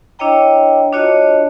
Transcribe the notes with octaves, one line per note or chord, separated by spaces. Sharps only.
D4 E4 C#5 D#5 G5 A#5
D4 F4 F#4 C#5 D#5 A5